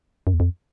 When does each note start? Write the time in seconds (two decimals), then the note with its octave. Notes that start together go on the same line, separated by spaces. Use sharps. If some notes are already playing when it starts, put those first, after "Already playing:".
0.27 F#2
0.34 E2
0.40 F2